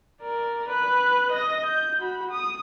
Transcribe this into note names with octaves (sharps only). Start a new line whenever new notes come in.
A#4 D5
B4 F#6
D#5 A#6
G6
F#4 B5
D#6